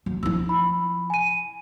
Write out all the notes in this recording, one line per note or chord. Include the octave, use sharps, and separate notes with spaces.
F#3
F3 E4 E6
B5
G#5 D#7